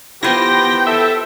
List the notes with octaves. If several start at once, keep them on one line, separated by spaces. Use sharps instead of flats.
B3 E4 F4 G4 C5 G5 A#6
A4 E5